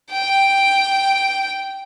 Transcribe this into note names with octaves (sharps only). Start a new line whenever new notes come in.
G5